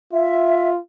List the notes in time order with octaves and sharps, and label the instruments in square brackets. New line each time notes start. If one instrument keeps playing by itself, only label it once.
[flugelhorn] F4 [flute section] E5